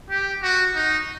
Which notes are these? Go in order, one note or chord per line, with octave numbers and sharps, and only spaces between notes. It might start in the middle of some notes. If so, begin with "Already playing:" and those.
G4
F#4
D#4